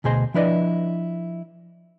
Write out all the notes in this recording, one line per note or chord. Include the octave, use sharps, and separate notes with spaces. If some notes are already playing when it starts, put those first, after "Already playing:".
D2 B2 G#4 C5 D#5
F3 D4 E4 B4 D5 D#5